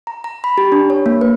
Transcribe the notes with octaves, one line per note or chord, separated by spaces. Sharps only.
A#5
A#5
B5
G4
D4
C#5
A#3
B4